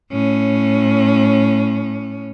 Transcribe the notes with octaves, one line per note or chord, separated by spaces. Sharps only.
A2 C#4